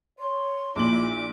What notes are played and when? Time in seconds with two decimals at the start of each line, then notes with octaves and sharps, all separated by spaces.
0.19 C#5 C6
0.76 A#1 A#2 D#4 E4 D6 F#7